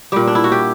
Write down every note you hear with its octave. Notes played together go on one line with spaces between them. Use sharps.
A#2 G3 G4
D4
E4
F#4
G4